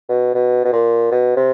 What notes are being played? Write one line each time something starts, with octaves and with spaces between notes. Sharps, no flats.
B2
B2
B2
A#2
B2
C3